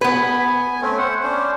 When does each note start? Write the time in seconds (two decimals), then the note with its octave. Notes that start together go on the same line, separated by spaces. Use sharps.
0.01 B3 B4 G#5
0.82 A3 C4 C#4
0.98 C5 F#5
1.23 C#4 D4 C5